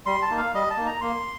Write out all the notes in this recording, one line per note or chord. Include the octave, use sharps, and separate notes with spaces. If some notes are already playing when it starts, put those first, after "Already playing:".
G3 C6
A5
A#3 D#4
F5
G3 D#5
A5
A#3 D#4
A#5
A#3 C6